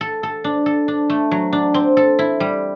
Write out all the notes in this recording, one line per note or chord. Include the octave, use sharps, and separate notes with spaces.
A4
A4
D4
A4
D4
A3
F#3
D4
C4
A4
E4
G3